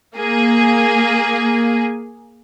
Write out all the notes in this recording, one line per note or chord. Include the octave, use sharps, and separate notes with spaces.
A#3 G#4